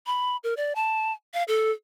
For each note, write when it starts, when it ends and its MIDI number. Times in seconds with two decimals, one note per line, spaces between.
0.06 0.37 83
0.44 0.54 70
0.57 0.73 74
0.75 1.13 81
1.34 1.43 77
1.48 1.71 69